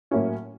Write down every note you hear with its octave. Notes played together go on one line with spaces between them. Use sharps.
A2 F#3 A#3 C#4 E4